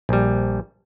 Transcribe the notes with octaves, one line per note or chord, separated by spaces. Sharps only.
A#1 G3